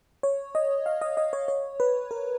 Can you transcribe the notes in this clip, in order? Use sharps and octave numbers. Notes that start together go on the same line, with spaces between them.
C#5
D#5
F5
D#5
D#5
C#5
C#5
B4
A#4